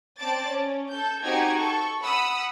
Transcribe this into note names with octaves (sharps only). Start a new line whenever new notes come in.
C4 D5 A5 D6 A6
C#4
A4 G6
C4 D#4 F#4 G4 G#5 G#6
A4 C#6
F#5 B5 D#6 E6